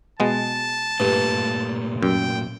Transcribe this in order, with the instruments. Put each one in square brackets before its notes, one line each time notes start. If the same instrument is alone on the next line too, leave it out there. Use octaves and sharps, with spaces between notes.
[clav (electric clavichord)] B2 G#3 B3 [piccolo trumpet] A5
[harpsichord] G2 [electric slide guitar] A#2 A3
[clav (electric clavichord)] F#2 [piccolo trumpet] G5